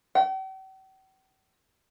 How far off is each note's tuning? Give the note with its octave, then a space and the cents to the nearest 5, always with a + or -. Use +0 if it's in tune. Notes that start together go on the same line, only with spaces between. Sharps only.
G5 -45